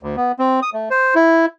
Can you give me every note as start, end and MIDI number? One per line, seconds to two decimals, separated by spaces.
0.03 0.16 38
0.16 0.32 59
0.39 0.60 60
0.62 0.70 87
0.73 0.89 57
0.91 1.15 72
1.15 1.46 64